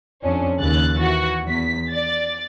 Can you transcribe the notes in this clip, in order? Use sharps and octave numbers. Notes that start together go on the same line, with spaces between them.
F2 C#4 D4
D#2 C#3 F#6 A6
E3 F#4
E2 B6
D5 A6